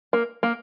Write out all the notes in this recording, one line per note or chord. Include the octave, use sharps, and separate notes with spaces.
A#3
A#3